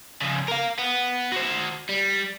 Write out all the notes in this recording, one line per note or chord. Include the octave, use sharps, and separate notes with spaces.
C#3 F3
A#4 F5
B3
F#4 C5
G3